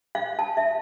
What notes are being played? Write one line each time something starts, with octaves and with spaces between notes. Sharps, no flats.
F5
A5
E5